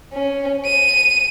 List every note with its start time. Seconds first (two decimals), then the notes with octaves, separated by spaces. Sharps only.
0.13 C#4
0.65 D#7